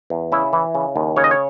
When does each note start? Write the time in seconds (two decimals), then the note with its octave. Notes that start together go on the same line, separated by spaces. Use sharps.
0.10 E2
0.32 C#3 E4
0.53 E3
0.75 C#3
0.96 D#2
1.16 C#3 C#5
1.24 D#5
1.31 C#5